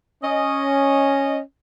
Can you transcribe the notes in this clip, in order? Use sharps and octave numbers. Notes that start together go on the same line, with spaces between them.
C#4 D#5